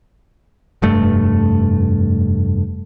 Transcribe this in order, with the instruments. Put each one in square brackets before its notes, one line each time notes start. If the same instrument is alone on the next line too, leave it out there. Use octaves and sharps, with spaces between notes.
[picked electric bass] F1 G2 A3